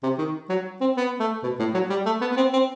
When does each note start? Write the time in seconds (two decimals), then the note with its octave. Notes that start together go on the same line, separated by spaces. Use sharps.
0.03 C3
0.18 D#3
0.49 F#3
0.81 C4
0.97 B3
1.20 A3
1.43 B2
1.59 A2
1.74 F#3
1.90 G3
2.06 A3
2.21 B3
2.31 B3
2.36 C4
2.53 C4